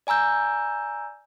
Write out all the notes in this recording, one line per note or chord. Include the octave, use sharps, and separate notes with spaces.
D5 G#5 A#5 E6 G6